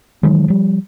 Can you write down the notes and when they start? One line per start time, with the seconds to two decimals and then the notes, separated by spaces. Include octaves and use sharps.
0.23 D#3 E3 F#3 G#3
0.48 F3 G3